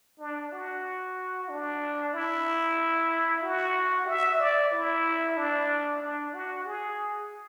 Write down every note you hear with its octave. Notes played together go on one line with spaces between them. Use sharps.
D4
F#4
D4
E4
F#4
E5
D5
E4
D4
D4
F#4
G#4